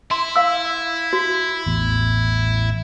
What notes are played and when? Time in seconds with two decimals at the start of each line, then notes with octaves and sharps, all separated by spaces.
0.11 E4 C6
0.36 F5 E6
1.13 F#4
1.66 A1 E2